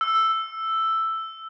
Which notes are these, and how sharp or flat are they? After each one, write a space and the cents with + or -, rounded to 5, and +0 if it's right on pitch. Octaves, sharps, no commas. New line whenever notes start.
E6 +5